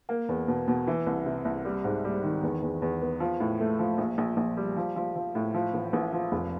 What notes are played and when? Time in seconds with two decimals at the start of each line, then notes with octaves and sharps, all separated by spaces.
0.09 A#3
0.29 E2
0.48 B2
0.68 B2
0.87 E3
1.06 C2
1.26 C3
1.45 C2
1.65 G3
1.84 G#2
2.04 G3
2.23 D#3
2.43 E2
2.62 E2
2.82 E2
3.02 B3
3.20 F3
3.40 A2
3.60 A3
3.79 F3
3.98 A#1
4.18 A#1
4.37 A#1
4.57 G3
4.77 F3
4.96 F3
5.16 F3
5.35 A2
5.54 F3
5.74 A1
5.93 A1
6.13 F3
6.32 F1